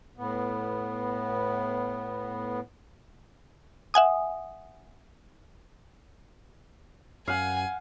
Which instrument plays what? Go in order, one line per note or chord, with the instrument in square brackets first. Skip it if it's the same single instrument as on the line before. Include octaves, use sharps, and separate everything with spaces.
[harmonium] A2 B3
[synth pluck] E5 F#5 G#5 D#6
[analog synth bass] F#2 [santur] F5 F#5 [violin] G#5